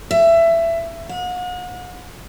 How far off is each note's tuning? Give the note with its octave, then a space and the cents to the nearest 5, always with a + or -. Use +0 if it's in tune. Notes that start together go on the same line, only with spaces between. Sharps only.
E5 +20
F#5 -40